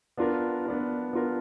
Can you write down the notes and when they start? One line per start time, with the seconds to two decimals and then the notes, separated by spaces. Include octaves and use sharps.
0.17 B3 D4 F4 A#4
0.65 B3 D4 F4 A#4
1.13 B3 D4 F4 A#4